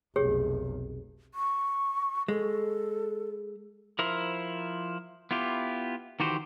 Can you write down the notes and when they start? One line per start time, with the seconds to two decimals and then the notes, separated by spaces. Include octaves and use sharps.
0.16 F1 B1 G4 G#4 C#5
1.34 C#6
2.28 G#3 A4
3.99 F3 E4 A#4 C5 A#5
5.31 B3 E4 F4 G4
6.20 D#3 E3 F#4 G4 C5